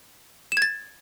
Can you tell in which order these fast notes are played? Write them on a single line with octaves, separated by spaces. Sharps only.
E7 G#6 A6